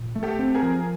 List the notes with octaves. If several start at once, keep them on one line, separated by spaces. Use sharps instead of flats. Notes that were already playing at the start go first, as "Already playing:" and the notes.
Already playing: A#2
A3
G4 A4
C4
G#4 A#4
F3